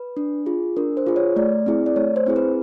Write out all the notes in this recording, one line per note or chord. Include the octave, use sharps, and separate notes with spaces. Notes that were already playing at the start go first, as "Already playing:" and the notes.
Already playing: B4
D4
F4 G#4
D4 A#4
C5
F4 G#4
C#5
A3 D5
C4 E4 G#4
D5
A3 C#5
C5
C4 E4 G#4
B4